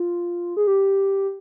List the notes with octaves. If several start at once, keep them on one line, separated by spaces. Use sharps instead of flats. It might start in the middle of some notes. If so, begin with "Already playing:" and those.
Already playing: F4
G#4
G4